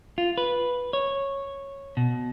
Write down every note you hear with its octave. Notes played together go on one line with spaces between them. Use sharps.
F4
B4
C#5
B2